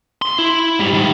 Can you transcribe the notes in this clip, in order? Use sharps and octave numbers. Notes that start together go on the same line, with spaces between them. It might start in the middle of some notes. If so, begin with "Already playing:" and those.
C6
E4
G#2 G3
D#3 G3